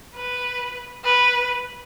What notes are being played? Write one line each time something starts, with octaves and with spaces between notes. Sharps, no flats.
B4
B4